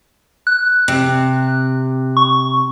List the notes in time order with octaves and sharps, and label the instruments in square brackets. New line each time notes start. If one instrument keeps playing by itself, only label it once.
[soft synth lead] F#6
[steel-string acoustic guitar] C3
[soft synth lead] C#6